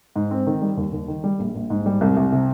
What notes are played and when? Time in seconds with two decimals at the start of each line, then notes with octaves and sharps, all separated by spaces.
0.16 G#2
0.31 C4
0.47 D#3
0.62 G3
0.77 D#2
0.93 D#2
1.08 D#3
1.24 G3
1.39 A#1
1.55 A#1
1.70 G#2
1.86 G3
2.01 C2
2.17 C2
2.32 C3